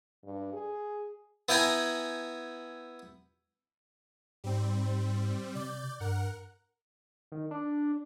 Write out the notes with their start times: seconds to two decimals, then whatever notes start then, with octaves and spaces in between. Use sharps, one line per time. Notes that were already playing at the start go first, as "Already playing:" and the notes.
0.24 G2
0.53 G#4
1.49 B3 E4 G5 G#5 A#5
4.44 G#2 G3 C4
5.55 C3 D5 G6
6.00 G2 A#4 F#5
7.32 D#3
7.51 D4